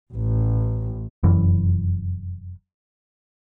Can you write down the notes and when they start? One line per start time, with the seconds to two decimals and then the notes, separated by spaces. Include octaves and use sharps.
0.13 A1
1.23 F1 F#2 E3